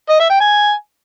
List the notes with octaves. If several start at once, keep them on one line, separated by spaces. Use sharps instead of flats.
D#5
E5
G5
G#5